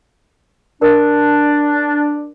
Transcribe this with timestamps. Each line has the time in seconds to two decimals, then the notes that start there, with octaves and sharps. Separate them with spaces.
0.82 D4 A#4